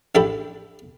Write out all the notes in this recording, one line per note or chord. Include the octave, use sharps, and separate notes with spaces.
A1 D4 G4 A4 B5